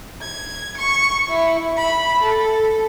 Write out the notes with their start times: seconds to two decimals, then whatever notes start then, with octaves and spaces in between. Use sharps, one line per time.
0.23 G#6
0.79 C#6
1.29 E4
1.77 B5
2.21 A4